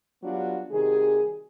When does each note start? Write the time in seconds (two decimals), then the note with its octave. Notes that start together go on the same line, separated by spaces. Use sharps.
0.24 F#3 G3 B3 D4 F4 F#4
0.71 C3 D#3 G3 F#4 G#4